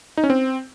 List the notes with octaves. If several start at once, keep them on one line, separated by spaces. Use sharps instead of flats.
D#4
C#4
C4